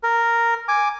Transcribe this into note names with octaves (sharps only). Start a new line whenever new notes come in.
A#4
G#5 D6